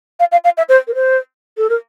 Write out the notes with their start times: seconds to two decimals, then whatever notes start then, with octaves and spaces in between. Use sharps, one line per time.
0.20 F5
0.32 F5
0.44 F5
0.57 E5
0.69 C5
0.87 A#4
0.95 C5
1.57 A4
1.69 A#4